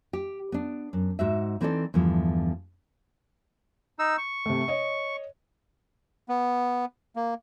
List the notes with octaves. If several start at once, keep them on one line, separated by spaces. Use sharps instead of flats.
G4
B3 D4
F#2
G#2 F#4 E5
E3 C4 D#4 A4 D5
E2 G2 D3 F3
D#4 E6
C#6
C3 A3
C#5 D#5
B3
A#3